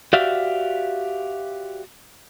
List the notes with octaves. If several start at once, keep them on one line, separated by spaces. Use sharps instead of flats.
F#4 G4 C5 D5 E5 F5